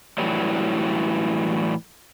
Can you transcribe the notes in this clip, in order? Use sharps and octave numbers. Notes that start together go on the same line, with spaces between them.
A2 E3 F#3 G3